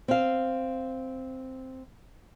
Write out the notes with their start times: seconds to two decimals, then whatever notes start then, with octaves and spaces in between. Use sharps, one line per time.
0.08 C4 F5